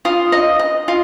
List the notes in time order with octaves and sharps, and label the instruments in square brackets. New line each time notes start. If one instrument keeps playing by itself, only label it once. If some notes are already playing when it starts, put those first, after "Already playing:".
[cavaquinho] F4 D#6
D#5
D#5
F4